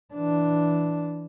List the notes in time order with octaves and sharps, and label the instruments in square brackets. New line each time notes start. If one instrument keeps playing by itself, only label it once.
[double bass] E3 D4